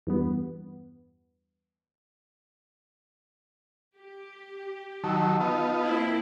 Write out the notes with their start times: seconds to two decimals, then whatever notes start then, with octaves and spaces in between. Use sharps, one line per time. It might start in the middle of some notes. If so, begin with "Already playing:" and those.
0.07 E2 G2 B3
3.98 G4
5.04 D#3 F#3 A5 E6
5.40 B3 D#4 F4
5.83 A#3 C4 E4